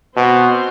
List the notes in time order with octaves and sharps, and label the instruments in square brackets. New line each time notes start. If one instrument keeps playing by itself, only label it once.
[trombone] B2 [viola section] C4 F#4 C5